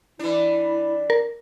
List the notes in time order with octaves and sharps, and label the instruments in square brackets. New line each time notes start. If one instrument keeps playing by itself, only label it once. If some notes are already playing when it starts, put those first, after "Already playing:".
[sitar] E3 D4 [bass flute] E4
[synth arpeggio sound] A#4